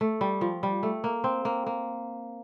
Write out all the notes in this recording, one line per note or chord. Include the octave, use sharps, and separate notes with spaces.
A3
G3
F3
G3
A3
A#3
C4
A#3
A#3